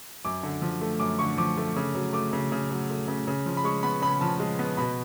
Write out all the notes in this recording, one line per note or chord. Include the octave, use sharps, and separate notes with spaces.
F#2 D6
D3
F3
A3
F#2 D6
D3 C#6
F3 D6
A3
C#3
F#3
A3 D6
C#3
C#3
F#3
A3
C#3
C#3
F3
B5
G#3 C#6
B3 B5
C#3 B5
F3 A5
G#3
B3
B2 B5